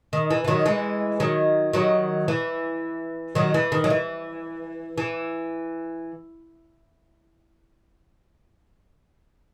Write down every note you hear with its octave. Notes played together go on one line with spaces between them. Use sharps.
D#3
E3
E3
D#3 F#3
E3 G#3
D#3 F#3
D#3 F#3
E3
D#3 F#3
E3
D#3
F#3
E3
E3